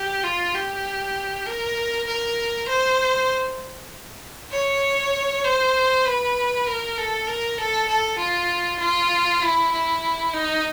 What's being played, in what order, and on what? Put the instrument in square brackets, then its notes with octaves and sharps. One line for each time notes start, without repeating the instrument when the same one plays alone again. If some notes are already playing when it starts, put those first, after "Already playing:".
Already playing: [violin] G4
F4
G4
A#4
A#4
C5
C#5
C5
B4
A#4
A4
A#4
A4
A4
F4
F4
E4
E4
D#4